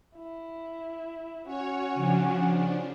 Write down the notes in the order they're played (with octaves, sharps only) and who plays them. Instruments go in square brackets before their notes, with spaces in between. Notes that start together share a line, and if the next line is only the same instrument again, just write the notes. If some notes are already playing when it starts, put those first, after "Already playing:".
[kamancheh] E4
[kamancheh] C#4 F#4 [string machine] C#5
[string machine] C#3 F3 D4